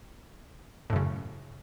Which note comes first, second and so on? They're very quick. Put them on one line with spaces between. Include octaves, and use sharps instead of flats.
A2 F#2 C#3